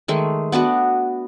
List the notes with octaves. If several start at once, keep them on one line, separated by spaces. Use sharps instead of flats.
D#3 G#3 A3
B3 D4 F#4 B4